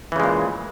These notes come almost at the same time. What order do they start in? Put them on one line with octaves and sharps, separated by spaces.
E3 C#3 G#3 A#2